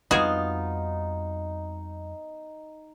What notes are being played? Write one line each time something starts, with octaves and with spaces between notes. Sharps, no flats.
F2 G3 B3 D#4 F4 F#4 G#4